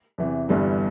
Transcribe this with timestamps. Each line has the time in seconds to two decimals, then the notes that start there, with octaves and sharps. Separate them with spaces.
0.18 E2 C3 E3
0.49 G1 G2 E3 G3 B3